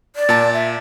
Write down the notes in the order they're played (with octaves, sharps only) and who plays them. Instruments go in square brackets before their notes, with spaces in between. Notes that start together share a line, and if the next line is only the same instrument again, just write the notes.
[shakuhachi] D5
[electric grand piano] A#2 A5
[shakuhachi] E5